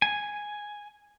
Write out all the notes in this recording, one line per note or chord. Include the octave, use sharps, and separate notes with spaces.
G#5